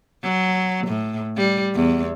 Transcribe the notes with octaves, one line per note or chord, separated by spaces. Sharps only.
F#3
A2
G3
E2